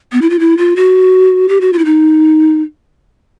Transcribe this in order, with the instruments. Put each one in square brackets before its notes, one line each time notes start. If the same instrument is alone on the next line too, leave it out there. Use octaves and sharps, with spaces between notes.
[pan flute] B3
E4
F4
E4
F4
F#4
G4
F#4
F4
E4
D#4